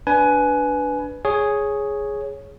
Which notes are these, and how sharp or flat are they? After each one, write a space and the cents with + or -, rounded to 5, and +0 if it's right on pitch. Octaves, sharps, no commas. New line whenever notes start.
D4 -10 B4 +0 G#5 +20
G#4 +0 C#5 +0